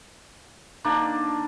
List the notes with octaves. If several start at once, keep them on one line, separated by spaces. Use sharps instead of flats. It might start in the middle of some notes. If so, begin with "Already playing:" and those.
D3 D#3 A#3 D4